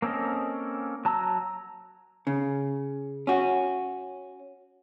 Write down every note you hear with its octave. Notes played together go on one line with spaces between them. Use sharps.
A#3 C4 C#4 A4 D#5
F#3 A5 A#5 E6
C#3
C#4 F#4